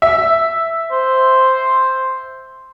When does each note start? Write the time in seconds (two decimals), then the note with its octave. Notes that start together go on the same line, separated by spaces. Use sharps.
0.02 E5
0.92 C5